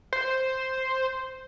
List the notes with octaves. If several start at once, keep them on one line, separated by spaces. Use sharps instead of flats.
C5